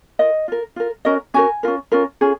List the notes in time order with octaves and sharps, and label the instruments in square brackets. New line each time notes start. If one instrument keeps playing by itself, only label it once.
[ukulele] F4 A#4 D#5
F4 A#4
F4 A#4
C#4 F#4 A#4 D#5
C#4 F#4 A#4 G#5
C#4 F4 A#4
C#4 F4 A#4
C#4 F4 G#4